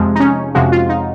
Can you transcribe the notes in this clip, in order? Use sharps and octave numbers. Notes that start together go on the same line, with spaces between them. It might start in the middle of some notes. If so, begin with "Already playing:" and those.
Already playing: F2 C3 F3 G#3
D#4
C#4
F2 C3 F3 G#3 F#4
F4
D#4